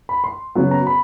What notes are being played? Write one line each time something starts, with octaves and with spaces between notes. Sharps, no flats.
B5
C6
C#3 F#3 B3
A#5
B5